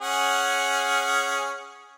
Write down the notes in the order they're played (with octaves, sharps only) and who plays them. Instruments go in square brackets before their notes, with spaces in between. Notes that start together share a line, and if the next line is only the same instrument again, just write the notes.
[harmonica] C#4 G#4 F#5